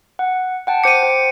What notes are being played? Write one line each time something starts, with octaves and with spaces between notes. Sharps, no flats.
F#5
F#5 G5 A5
C5 D6 C#7 D#7
C5 G5